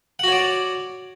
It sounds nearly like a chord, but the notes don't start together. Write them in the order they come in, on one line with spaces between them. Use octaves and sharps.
F#5 F#4 C#5 D5